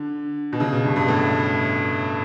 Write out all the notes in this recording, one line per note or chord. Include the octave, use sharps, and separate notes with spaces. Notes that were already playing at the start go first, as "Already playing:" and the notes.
Already playing: D3
B2
C#3
B2
G2
G2
A2